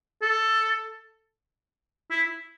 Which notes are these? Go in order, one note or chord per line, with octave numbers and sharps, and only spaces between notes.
A4
E4